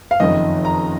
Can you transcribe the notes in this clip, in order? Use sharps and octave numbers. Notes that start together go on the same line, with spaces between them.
F5
F#1 F2 D#3 D#5
A#5